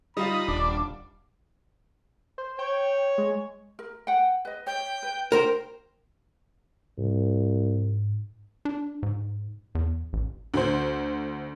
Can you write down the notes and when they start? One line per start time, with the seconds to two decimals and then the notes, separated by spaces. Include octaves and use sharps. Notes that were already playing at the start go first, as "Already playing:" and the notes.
0.17 G3 D#4 F4 F5 B5
0.48 D#1 D4
2.38 C5
2.59 C#5 G5
3.18 G#3
3.79 A#4
4.07 F#5 G5
4.45 B4 D#5
4.67 C#5 G5
5.03 B4
5.32 A#4 C5 G5
6.98 C2 G#2
8.65 D4
9.03 G#2
9.75 E2
10.13 A1
10.54 D2 C5